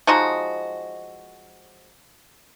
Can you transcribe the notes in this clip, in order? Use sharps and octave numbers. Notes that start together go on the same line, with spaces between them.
F3 G#3 D#4 F#4